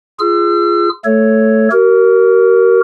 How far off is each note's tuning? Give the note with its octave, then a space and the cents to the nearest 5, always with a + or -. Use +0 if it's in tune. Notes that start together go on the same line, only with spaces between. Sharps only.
F4 -15 G#4 +0 E6 +40
A3 +0 A4 +0 C#5 +0
F#4 +45 A#4 +0